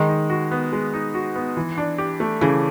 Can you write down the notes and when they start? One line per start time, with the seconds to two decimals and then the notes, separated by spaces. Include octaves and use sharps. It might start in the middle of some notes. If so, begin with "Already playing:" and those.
Already playing: D#3 G#3
0.09 D#4
0.30 F#4
0.51 B3
0.72 G#3
0.94 D#4
1.14 F#4
1.36 B3
1.57 E3
1.78 D4
1.98 G4
2.20 A3
2.41 C#3 E3